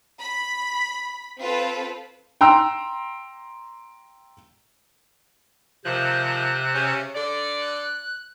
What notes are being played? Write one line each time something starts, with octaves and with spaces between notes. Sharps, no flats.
B5
C4 F4 A4 B4
G5 A#5 C6 E6
C3 D#3 F3 C5 F#6
C#3 C#4
D3 D5
F#6